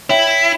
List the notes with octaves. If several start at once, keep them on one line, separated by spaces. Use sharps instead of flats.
E4 C#5 E5 G5